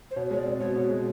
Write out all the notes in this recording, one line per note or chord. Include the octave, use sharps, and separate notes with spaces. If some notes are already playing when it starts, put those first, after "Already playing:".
C5
B2 C#5
G#3 C#5
D5
C4
B2 C#5
B2
G#3